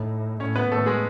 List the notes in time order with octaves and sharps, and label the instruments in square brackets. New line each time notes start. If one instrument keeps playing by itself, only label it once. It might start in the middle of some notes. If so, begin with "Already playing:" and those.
Already playing: [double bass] A2 [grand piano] D#4
[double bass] A2 [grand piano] C#4 C#5
[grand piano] B3 B4
[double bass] A2 [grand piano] A3 A4
[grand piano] G#3 G#4